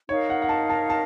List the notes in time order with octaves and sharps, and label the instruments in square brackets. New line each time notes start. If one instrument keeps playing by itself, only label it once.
[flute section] D#4 A#4 F5 [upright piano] C#5
[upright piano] F#5
F#5
A5
A5
A5